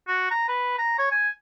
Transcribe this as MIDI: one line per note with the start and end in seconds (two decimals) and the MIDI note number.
0.08 0.27 66
0.31 0.45 82
0.48 0.77 71
0.79 0.94 82
0.99 1.08 73
1.11 1.29 80